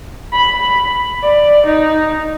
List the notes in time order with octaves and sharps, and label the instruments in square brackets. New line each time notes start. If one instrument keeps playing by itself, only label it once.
[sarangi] B5
D5
D#4